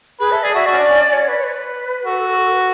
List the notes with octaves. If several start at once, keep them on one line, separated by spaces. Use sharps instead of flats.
G#4 B4
A4 E5
G#4 D5
F#4 E5
F#4 D5
C#4
D4
C#4
C#5
B4
C#5
B4
F#4 A4
B4